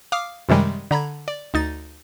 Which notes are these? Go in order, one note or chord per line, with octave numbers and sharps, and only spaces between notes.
F5 D6 D#6 F6
F#2 C3 D#3 G3 G#3
D3 A#5 B5 G#6
D5
D2 D#4 A6